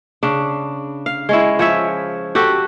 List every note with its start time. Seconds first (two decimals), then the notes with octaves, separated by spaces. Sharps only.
0.23 C#3 D4
1.06 F5
1.29 G#3 C#4 E4
1.59 F3 C#5 E5
2.35 F#4 G4 A4